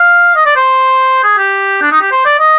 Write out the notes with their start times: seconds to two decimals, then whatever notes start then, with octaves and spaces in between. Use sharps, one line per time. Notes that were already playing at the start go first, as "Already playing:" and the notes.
Already playing: F5
0.36 D#5
0.46 D5
0.56 C5
1.23 G#4
1.38 G4
1.82 D4
1.92 D#4
2.01 G4
2.11 C5
2.26 D5
2.39 D#5